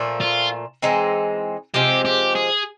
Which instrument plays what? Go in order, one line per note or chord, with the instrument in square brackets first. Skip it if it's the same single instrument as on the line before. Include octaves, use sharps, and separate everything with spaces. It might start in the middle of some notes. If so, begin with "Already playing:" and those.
Already playing: [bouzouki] A#2 F3 A3
[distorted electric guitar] F4
[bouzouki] E3 G#3 C4 D#4
[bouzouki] C3 F3 G#3 [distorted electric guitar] G4
[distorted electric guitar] G4
G#4